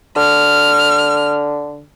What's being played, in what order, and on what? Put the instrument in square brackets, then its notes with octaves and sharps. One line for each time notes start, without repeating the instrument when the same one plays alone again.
[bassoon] D3 [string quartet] F6